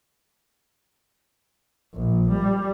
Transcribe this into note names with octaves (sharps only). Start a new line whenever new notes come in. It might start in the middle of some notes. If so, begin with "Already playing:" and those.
A#1
G3